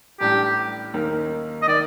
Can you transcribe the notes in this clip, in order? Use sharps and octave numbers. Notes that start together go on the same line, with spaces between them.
A1 A2 G3 D4 G4
D#2 D#3 A#3 D#4 A#4
D#5
D#3 A#3 D5